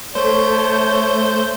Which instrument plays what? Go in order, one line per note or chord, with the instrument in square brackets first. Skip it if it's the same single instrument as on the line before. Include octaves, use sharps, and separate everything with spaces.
[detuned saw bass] A3 [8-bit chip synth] C5 G6 [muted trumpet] C#5